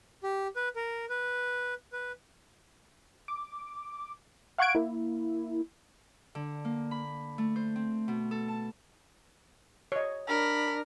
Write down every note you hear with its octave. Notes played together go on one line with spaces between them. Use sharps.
G4
B4
A#4
B4
B4
D6
F5 F#5 C#6 F#6 G#6 D7
A#3 E4
D3
A#3
B5
A3
C5
C4
B2
A4
A5
C#5 D#5
D4 A#4 B5